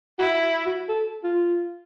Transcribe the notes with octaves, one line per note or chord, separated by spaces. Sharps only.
E4 F#4
F#4
A4
F4